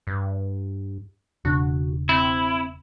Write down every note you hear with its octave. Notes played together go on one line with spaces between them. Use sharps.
G2
E1 C#3 D4 F#4
C4 E4